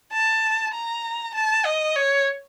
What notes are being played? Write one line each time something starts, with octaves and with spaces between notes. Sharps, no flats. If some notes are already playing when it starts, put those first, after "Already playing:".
A5
A#5
A5
D#5
C#5